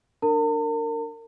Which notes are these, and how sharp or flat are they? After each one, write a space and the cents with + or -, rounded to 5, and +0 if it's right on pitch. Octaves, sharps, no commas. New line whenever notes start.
D4 +15 A#4 -25 A5 +45